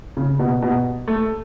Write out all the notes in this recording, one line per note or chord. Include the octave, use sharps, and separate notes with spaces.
C#3
B2
B2
A3